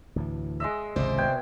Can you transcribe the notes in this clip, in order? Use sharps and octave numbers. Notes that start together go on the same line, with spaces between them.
D2 A2 E3
G#3 D#5 E5
G#1 C#2 C3 C5 D5
B2 G5 G#5